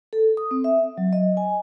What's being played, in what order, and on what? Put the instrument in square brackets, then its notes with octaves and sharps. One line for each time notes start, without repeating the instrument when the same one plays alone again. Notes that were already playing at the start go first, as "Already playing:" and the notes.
[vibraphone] A4
D#6
C4
E5
F#3
D#5
G#5